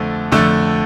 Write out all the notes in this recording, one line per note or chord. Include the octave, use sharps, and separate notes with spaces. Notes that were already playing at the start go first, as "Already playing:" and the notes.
Already playing: F2 D3 A3
F2 D3 A3